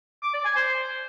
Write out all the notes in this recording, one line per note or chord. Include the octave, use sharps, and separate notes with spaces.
D6
D5
G#5
C5